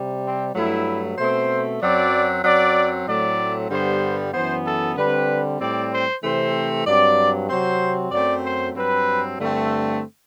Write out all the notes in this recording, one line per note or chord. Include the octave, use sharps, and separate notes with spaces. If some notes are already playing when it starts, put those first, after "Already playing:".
Already playing: C3 G3
C4
G2 F#3 A3 E4
B2 A3 C4 C5
F#2 F#3 C4 D5
F#2 F#3 C4 D5
A2 F#3 A3 C4 D5
G2 D3 G3 B3 C5
F#2 E3 B3 C5
A4
D3 G3 C4 B4
A2 G3 C4 D5
C5
C3 E3 A3 C4 C5
G2 F#3 C4 D5
C3 F#3 C4 C5
F#2 F#3 A3 C4 D5
C5
G2 F#3 C4 B4
G2 D3 A3 C4